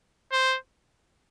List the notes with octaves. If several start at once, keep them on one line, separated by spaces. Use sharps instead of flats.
C5